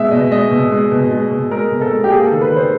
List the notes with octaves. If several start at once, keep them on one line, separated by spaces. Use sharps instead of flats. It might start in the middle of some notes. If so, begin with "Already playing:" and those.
Already playing: B2 G#3 E5
B2 D#5
G#3 D#5
B2
G#3
B2
G#3
B2
G#3 A#4
B2
A4
G#3
G4
A#3 G#4
A4
D#3
B4
D#3
C5